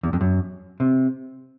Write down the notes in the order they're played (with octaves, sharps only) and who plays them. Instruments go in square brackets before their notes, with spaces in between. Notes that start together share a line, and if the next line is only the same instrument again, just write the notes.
[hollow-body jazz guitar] E2
F2
F#2
C3